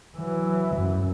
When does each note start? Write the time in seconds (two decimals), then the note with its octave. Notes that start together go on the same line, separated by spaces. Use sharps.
0.17 E3 F#3
0.76 F#2